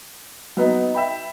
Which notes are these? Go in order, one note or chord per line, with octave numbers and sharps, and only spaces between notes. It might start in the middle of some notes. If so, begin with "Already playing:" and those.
F#3 B3 D#4
E5 G5 B5